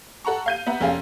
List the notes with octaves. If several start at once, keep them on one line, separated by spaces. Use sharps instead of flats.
A4 F#5 A#5 C#6
F5 G6 D#7
B3 E5 F#5 A#5
F1 C#4 G#4 F5